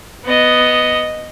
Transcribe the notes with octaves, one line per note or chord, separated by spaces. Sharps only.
B3 D#5